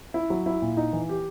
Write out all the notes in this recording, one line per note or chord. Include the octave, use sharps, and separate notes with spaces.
E4
F#3
E4
A#2
D#4
E3
G4